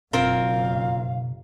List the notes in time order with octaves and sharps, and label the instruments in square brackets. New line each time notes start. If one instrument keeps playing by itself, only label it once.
[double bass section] F#1 [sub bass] B2 [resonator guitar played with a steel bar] C4 F4 A#4 [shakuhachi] F5